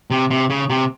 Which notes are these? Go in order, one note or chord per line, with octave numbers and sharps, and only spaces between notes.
C3
C3
C#3
C3